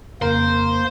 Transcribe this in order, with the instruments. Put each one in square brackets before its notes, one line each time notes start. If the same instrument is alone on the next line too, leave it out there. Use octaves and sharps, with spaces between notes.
[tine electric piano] F2 C#3 [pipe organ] A#3 [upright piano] A#4 [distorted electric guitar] C5